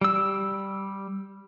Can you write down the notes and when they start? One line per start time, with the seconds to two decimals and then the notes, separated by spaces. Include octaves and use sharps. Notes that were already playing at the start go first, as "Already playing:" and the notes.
0.01 G3 E6